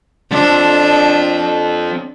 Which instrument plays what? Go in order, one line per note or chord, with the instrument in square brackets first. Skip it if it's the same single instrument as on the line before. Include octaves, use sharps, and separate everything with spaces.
[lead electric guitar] F3 C4 [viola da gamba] D4